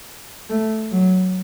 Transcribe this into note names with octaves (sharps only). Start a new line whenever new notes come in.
A3
F#3